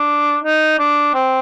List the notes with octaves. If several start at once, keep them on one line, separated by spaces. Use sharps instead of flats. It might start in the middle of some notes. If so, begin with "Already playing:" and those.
Already playing: D4
D#4
D4
C4